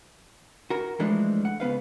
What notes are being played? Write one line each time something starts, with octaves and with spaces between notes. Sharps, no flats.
F#4 A#4
E3 F3 G#3 A3 D4
F#5
C#2 B3 B4 F5